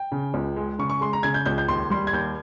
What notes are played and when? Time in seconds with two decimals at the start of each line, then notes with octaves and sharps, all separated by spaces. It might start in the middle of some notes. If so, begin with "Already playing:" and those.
Already playing: G5
0.12 C#3
0.34 C#2
0.56 G#3
0.79 C#3 C#6
0.90 C#6
1.01 G#3 C6
1.13 A#5
1.23 C#3 G#6
1.34 G6
1.45 C#2 G6
1.58 G6
1.68 D#2 C6
1.90 G3 C6
2.07 G#6
2.13 D#2 G6